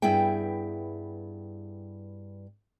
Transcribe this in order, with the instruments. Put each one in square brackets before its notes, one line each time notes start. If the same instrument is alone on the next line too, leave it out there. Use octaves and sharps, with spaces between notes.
[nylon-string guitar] G2 B3 E4 G#4 E5 G5